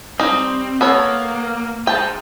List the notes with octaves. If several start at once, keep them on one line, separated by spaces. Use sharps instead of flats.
G3 C4 D#4
A#3 B3 A4 C#5
G#4 C5 G5 A5